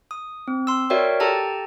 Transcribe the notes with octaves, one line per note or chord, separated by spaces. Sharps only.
D#6
C4
C6 E6
F#4 A#4 C#5 D5 E5 G5
G4 A4 G5 A5 A#5